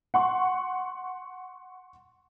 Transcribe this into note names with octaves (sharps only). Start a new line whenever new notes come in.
F#5 C6 C#6